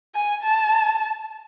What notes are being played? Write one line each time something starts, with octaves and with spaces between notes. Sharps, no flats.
G#5
A5